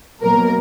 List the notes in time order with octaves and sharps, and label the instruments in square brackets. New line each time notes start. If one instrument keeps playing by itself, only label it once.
[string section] B2 F#3 A#3 A#4